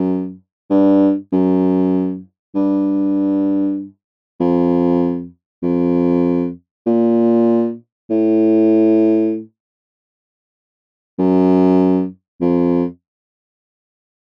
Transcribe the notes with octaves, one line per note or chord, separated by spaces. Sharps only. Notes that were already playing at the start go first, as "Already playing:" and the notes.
Already playing: F#2
G2
F#2
G2
F2
F2
A#2
A2
F#2
F2